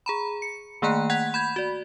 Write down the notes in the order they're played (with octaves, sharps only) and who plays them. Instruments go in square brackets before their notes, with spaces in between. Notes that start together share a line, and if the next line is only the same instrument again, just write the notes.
[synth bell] G#4 A#5 B5
C#7
D#3 A3 A#3 G5 A#5 F#6
F#5 F#6 G#6 B6 F7
B5 G6 G#6
F#4 D5